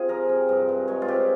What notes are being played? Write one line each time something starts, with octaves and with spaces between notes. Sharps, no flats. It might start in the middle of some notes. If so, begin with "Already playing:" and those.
Already playing: C3 F4 G#4
F3 A#4
C3
G2
G2
G#3 C#5
F4
C4 G4